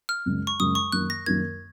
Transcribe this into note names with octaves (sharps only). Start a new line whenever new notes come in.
F6
F#2 C#3 G#3
C#6
F#2 C#3 G#3 D#6
C#6
F#2 D#3 A#3 F#6
A#6
F#2 D#3 A#3 G#6